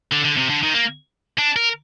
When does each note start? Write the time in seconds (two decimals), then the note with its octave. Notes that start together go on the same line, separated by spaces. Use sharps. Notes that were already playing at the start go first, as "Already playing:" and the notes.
0.12 D3
0.24 D3
0.37 C3
0.50 D3
0.63 D#3
0.75 A#3
1.38 D4
1.56 A#4